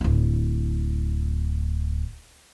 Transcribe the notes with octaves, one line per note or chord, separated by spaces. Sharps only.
D1 E4